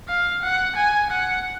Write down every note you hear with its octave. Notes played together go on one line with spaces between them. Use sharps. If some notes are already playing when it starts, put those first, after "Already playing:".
F5
F#5
G#5
F#5